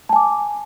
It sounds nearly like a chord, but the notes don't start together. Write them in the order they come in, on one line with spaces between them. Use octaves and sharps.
A5 G#5 D6